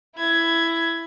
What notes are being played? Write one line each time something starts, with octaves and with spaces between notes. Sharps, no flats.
E4 G#6